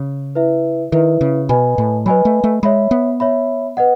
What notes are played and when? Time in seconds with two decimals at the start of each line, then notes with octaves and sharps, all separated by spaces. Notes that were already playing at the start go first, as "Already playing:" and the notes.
Already playing: C#3
0.35 E4 B4 E5
0.92 D#3 E4 B4 E5
1.21 C#3
1.49 B2 B4 D#5 G#5 B5
1.78 A2
2.06 F#3 B4 D#5 G#5 B5
2.25 A3
2.44 A3
2.63 G#3 C#5 E5 B5
2.91 B3
3.20 C#5 E5 B5
3.77 B4 D#5 F#5